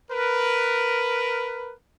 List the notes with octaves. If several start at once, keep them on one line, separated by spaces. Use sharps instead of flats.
A#4 B4